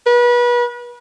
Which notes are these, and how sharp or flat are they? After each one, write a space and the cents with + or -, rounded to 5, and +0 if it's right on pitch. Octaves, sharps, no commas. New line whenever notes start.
B4 -30